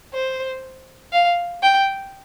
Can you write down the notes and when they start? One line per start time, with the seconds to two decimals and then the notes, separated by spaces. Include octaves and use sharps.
0.14 C5
1.13 F5
1.62 G5